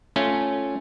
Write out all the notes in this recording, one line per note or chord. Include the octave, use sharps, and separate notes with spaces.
A3 C#4 F4